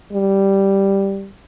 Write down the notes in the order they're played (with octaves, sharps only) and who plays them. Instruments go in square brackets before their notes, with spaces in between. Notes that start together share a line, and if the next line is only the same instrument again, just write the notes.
[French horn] G3